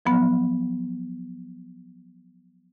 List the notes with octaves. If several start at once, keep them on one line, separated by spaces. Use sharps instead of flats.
F3 F#3 B3